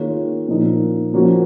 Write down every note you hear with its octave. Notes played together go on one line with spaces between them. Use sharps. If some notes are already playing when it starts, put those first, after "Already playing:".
Already playing: D#3 A#3 F4 G#4 C#5
A#2 F3 A#3 D#4
F3 A#3 C#4 F#4